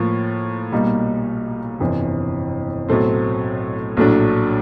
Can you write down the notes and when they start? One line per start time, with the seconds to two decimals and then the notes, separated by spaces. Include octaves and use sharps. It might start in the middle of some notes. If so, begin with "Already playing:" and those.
Already playing: A2 F3 A#3
0.72 B1 A#2 G3 A#3 D#4
1.80 G1 F2 C3 E3
2.88 B1 A2 F#3 A3 C4
3.97 A#1 A2 F#3 A3 D4